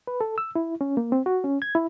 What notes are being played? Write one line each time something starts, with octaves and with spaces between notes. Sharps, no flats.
B4
A4
E6
E4
C#4
A#3
C4
F#4
C#4
G#6
E4